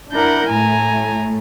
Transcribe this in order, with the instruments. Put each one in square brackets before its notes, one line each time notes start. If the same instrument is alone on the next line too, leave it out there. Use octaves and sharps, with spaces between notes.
[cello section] D4 E4 A#4 [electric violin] F#5 G6
[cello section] A2 A3 [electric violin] G#5 A#5